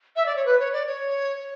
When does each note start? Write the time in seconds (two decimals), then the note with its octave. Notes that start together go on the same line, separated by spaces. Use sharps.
0.16 E5
0.26 D5
0.36 C#5
0.45 B4
0.59 C#5
0.73 D5
0.87 C#5